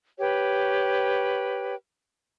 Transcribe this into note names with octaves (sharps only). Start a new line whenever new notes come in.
G4 B4 C#5 G5